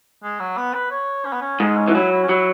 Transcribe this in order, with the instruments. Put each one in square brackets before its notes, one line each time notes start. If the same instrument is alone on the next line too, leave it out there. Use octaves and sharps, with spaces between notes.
[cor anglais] G#3
F#3
B3
B4
C#5
C#4
B3
C#4
[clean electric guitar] G#2 [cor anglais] G#3
[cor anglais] C#4
[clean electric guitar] E3 [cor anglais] F#4
[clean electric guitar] F#3 [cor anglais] E4
[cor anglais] E4
C#4
[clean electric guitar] F#3 [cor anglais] E4